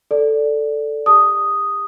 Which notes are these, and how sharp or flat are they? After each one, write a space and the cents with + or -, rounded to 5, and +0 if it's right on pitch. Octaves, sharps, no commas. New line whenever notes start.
A4 +0 D5 -5
G4 +30 A5 +0 D#6 +0